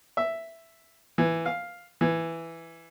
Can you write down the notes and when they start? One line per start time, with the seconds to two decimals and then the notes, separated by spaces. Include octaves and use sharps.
0.17 E5
1.18 E3
1.46 F5
2.01 E3